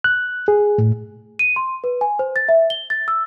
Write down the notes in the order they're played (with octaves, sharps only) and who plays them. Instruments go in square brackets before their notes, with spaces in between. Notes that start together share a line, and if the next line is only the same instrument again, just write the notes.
[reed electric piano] F#6
G#4
A2
[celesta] D#7
C6
B4
G#5
C5
A6
E5
G7
A6
E6